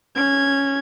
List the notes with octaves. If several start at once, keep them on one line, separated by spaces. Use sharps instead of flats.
C#4 G#6